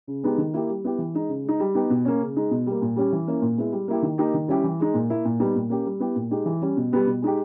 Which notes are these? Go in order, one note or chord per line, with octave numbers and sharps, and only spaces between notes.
C#3
G#3 B3 D#4 G4
D#3
A#3 E4 G4
G3
B3 E4 G4
E3
G#3 D#4
C#3
G#3 D#4
G3
B3 D#4 G4
B2
A#3 C#4
C#3
G#3 D#4
B2
G3 A#3
A#2
G3 C#4 G4
E3
A#3 C#4 E4
A#2
G#3 B3 E4
G3
A#3 E4 G4
D#3
A#3 D#4 G4
D#3
G3 C#4 E4 G4
E3
G#3 D#4
A#2
A#3 E4
A#2
G3 B3 D#4
A#2
A#3 C#4 G4
G3
B3 E4 G4
A#2
G#3 D#4 G4
E3
G3 C#4
B2
G3 B3 G4
B2
G#3 D#4 G4